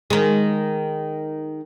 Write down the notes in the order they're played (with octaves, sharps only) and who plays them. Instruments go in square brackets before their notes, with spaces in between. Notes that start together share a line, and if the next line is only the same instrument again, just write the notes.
[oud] D#3 G#3